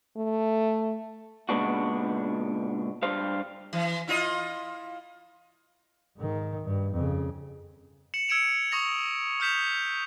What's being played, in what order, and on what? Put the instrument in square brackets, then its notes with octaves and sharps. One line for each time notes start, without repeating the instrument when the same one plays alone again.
[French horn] A3
[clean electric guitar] A#2 C#3 G#3 B3 D4 F#4
G2 G3 C5 F5
[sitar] E3
E4 F4 D#5
[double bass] G#2 D#3
G2
F2 C#3
[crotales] C#7 E7 F#7
E6 G#6 C#7 D7 E7 F7
C#6 D#6 A#6 F7
D#6 F6 G6 B6 E7 F7